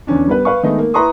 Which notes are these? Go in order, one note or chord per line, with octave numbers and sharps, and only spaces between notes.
E2 D3 C#4 D4
G3 B3 B4
B4 F5 C#6
D#3 G#3 A3 B3 D#4
A#3
E4 B4 A#5 C6 C#6 D#6